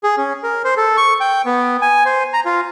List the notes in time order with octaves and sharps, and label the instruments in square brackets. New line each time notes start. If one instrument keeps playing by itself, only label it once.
[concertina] G#4
C#4
A#4
C5
A4
C#6
G5
B3
G#5
C5
A#5
F4